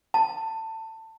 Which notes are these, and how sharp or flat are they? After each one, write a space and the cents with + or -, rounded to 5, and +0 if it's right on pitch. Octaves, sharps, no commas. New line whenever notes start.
A5 +20